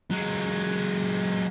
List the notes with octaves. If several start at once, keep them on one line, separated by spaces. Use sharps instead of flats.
F#3 G#3